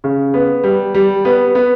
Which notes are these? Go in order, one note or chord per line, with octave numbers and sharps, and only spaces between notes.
C#3
B3
G3
G3
B3
B3